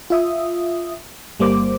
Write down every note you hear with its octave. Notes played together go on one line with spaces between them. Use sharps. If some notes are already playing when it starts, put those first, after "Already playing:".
F4 E5 D#6
G1 G3 A#3 C5 D6